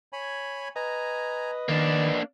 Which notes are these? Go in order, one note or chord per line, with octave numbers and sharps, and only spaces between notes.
C#5 G#5 B5
B4 D#5 G#5 A#5
D#3 A#3 D4 D5